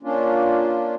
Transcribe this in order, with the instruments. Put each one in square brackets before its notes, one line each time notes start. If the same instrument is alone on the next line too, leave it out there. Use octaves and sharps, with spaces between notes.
[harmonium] A#3 C#4 D4 F4